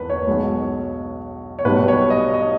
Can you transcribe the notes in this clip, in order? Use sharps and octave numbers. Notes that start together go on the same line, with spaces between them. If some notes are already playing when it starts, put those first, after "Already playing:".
Already playing: E1 E2 B4
C#5
B1 B2 G#3
C#5
B1 B2 G3 B4
C#5
D#5
D#5